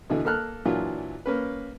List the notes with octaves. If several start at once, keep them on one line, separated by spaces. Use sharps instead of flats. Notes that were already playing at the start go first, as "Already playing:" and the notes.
B2 D3 E3
A#3 A4 F6 F#6
A#2 E3 F#3 D4 F4
A#3 C#4 B4